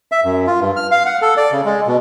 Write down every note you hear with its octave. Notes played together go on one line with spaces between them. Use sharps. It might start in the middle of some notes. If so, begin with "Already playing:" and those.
E5
F#2
F4
G2
F6
F5
F#5
A4
D5
C#3
G#3
B2